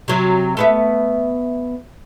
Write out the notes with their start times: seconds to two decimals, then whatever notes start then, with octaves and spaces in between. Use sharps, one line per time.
0.08 C3 F#3
0.57 A3 B3 E5